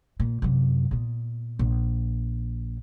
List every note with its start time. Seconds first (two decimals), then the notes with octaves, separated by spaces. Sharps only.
0.20 A#2
0.42 F#2 C3
0.91 A#2 B3
1.59 A#1